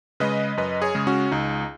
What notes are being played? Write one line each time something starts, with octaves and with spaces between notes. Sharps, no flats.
C#3 G#3 B4 D#5
F#2 B4 D#5
G#4 C#5
C#3 G#3
C#4 F#4
C#2 D#4